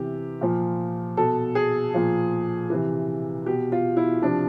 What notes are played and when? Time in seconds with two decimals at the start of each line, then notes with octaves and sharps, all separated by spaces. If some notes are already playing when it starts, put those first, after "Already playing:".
Already playing: C3 E3 G4
0.41 A#2 F3
1.17 B2 A4
1.55 G#4
1.94 A#2 F3
2.70 C3 E3
3.46 B2 G4
3.72 F4
3.97 E4
4.22 C3 F3 D4